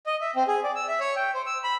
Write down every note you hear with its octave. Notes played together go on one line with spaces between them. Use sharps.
D#5
E5
C4
G#4
D5
E6
E5
C#5
G5
C5
E6
B5